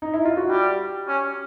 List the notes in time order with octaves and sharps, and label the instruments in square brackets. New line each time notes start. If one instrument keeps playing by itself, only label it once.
[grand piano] D#4
E4
F4
F#4
[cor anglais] G3 [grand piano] G4
[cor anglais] C#4